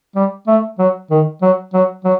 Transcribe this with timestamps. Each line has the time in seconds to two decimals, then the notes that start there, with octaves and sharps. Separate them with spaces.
0.15 G3
0.47 A3
0.79 F#3
1.11 D#3
1.42 F#3
1.73 F#3
2.04 F#3